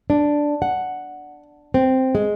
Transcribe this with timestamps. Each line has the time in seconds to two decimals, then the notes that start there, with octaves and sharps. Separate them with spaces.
0.10 D4
0.62 F#5
1.74 C4
2.15 G#3